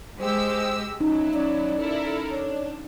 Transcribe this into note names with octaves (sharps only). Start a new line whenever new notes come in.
G#3 G4 C5 E6
F#3 C#4 D#4 E4
C#4 D5
E4 A4 A#4
D4 C#5